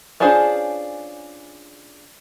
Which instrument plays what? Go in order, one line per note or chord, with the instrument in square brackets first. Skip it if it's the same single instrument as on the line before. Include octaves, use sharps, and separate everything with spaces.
[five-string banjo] C#4 D4 F4 G#4 C5